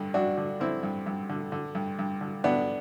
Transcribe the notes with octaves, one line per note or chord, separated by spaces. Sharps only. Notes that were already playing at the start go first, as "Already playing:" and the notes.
Already playing: G2 D3
G2 D4 F#4
D3
D3 C4 E4
G2
G2
D3
D3
G2
G2
D3
D3 B3 D4